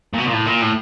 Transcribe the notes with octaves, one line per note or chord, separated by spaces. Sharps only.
A#2
B2
A#2
A2
A#2
A2